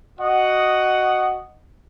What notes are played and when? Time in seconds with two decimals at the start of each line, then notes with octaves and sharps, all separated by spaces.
0.19 F#4 D#5 F#5